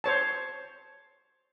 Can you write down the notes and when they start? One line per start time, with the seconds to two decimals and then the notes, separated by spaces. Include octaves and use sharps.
0.04 C5 C#5 A5